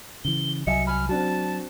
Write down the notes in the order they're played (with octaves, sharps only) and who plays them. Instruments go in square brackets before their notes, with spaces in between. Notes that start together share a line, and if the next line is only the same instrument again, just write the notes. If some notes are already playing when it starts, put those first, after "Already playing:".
[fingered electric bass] C#3 E3 [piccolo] G7
[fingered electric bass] C2 F#3 [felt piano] D#5 E5 G#5 [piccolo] C#7
[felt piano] G#5 B5 [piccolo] F6
[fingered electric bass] F#3 [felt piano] C4 D4 F#4 [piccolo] A5